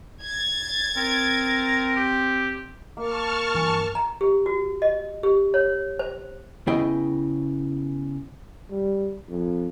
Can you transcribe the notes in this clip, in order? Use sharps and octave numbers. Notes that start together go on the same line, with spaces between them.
G#6 A6
C4 A#4
G4
A#3 A5 C#6 F6
G2 E3 G#5
A#5
G4
F#4
D#5
G4
C#5
C5
C#3 B3 E4 G#4 D#5 G5
G3
F2